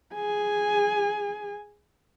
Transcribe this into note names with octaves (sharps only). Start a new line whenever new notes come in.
G#4 G#5